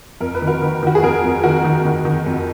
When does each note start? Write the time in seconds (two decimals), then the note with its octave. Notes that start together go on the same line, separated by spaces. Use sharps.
0.21 F2 A#4
0.35 B4
0.42 D#3
0.47 F#4 A#4
0.62 D#3
0.83 D#3 F#4
0.95 G#4
1.03 F2 F#4 A#4
1.24 F2
1.43 D#3 F#4 A#4
1.64 D#3
1.85 D#3
2.05 D#3
2.26 F2